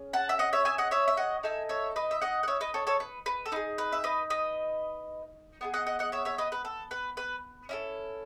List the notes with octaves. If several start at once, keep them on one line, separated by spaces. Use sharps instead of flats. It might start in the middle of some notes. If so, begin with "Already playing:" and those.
Already playing: C#4 G#4
F#5 A5
E5
D#5 F#5
C#5 E5
E5 G#5
D#5 F#5
C#5 E5
E5
D#5 F#5
D#4 A4 E5 G#5
C#5 E5
B4 D#5
E5
D#5 F#5
F#5
C#5 E5
B4 D#5
A4 C#5
A4 C#5
B4
B4
A4
D#4 G#4 B4
B4
E5
B4 D#5
B4 D#5
B3 E4 G#4
D#5 F#5
D#5 F#5
D#5 F#5
C#5 E5
C#5 E5
B4 D#5
B4
A4
B4
B4
C#4 E4 A4